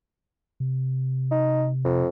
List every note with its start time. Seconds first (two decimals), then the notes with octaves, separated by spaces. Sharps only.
0.60 C3
1.31 D#4
1.84 F2